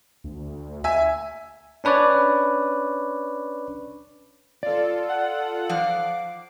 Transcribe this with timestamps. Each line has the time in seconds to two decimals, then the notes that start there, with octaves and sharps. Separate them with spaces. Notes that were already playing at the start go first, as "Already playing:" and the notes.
0.24 D2
0.84 E5 G#5
1.84 C#4 D4 B4 C#5 D5
4.63 F4 A4 D5
5.09 F#5
5.69 F3 F5 D6